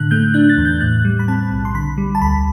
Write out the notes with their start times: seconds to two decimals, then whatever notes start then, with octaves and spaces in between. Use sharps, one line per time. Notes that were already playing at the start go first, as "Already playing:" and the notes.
Already playing: A2 D3 F#6
0.11 A3 G6
0.34 D4 F#6
0.49 A6
0.58 E2
0.65 G6
0.81 A2 F#6
1.05 G3
1.19 B5
1.28 C4 A5
1.51 B1
1.65 C6
1.74 D3 B5
1.98 G3
2.15 A5
2.21 D2 B5